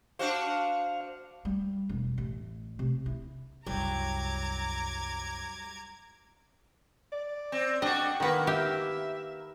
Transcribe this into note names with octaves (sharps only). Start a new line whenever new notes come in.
D4 F#4 C5 F5
G3
E1
A1
C3
E4
C2 F#2 F#3 G3 A#5 D6 G#6
D5
C4
D4 F#4 D#5 G5
D#3 A#3 B3 B4
G4 E5